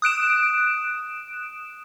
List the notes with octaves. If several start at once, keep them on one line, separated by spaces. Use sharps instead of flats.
D#6 F#6 D7 E7